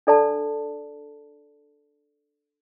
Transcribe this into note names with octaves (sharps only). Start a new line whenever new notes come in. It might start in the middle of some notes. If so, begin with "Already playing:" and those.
D4 A4 D5 A5